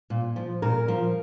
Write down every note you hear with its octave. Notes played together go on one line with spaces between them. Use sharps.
A#2
F3
A#2 A#4
F3